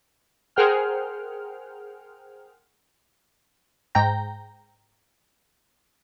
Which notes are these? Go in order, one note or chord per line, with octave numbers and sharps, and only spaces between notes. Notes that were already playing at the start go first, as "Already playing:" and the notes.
G#4 A#4 C5 F#5 G5 F6
G#2 G5 A#5